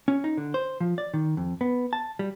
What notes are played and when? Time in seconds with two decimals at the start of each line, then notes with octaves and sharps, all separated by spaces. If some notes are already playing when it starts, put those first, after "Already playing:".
0.08 C#4
0.24 D#4
0.38 D3
0.54 C5
0.80 F3
0.98 D5
1.14 D#3
1.37 F2
1.61 B3
1.93 A5
2.19 G3